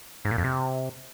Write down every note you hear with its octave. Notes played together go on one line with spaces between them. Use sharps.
G#2
A#2
F2
C3